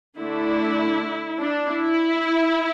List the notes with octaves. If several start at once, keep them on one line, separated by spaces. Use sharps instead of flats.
D3 A3 D4 E4
D4
E4